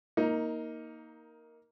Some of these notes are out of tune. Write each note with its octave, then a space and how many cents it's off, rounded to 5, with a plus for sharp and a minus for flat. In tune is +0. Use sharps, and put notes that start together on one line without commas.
A#3 +0 D#4 +20